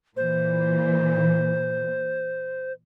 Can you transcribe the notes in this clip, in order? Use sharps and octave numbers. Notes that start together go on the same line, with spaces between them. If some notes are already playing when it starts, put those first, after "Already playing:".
A#2 E3 C5